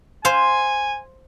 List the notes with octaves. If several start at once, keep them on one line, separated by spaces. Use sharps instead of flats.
C5 F5 G#5